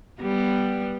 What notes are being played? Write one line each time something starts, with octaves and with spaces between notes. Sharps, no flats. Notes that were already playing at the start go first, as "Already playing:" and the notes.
G3 B3